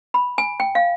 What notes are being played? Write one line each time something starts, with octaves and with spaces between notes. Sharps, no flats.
B5
G#5
G5
F5